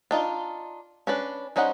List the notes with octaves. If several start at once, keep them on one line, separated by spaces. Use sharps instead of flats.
D4 D#4 F4
C#4 D4 B4
G3 C#4 D#4 C5 F#5